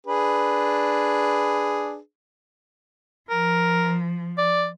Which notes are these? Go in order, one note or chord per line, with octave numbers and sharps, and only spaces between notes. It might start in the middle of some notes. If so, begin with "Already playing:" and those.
D4 G#4 B4
F3 A#4
D5